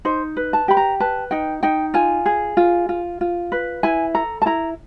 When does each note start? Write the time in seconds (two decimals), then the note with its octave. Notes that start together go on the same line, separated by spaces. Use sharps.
0.05 D#4 C5
0.37 B4
0.53 A5
0.68 G4 B5
0.77 A#5
1.00 B4 A5
1.31 D#4 G5
1.63 D#4 G5
1.94 F4 G#5
2.26 G#4
2.57 F4
2.89 F4
3.21 F4
3.52 B4
3.83 E4 G#5
4.14 A4 A#5
4.42 A5
4.46 E4 A#5